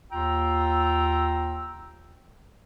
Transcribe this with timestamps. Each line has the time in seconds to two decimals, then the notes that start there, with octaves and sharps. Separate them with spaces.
0.11 D#2 F4 G5 A#5 E6